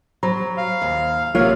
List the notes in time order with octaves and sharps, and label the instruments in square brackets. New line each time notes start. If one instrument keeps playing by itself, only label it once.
[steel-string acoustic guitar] F#3 [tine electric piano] C5 A#5 B5
[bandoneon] F5
[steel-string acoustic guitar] D#2
[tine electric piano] A1 C#5 F6 [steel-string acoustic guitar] C3 F4 [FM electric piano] F3 A#3 [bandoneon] F#3